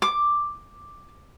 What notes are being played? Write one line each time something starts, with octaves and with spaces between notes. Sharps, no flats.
D6